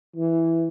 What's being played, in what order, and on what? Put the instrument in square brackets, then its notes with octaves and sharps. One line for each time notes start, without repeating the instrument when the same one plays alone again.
[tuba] E3